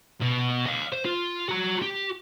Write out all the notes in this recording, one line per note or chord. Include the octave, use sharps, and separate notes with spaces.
B2
D#5 F5
C5
F4
F#4 A#5
G4